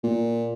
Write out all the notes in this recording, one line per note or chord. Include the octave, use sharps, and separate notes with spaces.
A#2